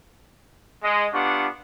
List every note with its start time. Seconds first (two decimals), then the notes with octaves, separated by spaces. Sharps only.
0.83 G#3 D#5
1.13 B3 D4 F4 G4 F#5 C#6